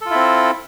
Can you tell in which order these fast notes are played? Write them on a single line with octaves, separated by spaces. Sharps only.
A4 F4 E4 C4